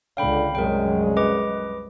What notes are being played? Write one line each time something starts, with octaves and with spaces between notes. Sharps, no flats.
C#2 D3 F5 G5 B5
C2 F#2 G#3 A#4 G5
B4 D#5 D6